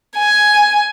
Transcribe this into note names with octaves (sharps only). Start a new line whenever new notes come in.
G#5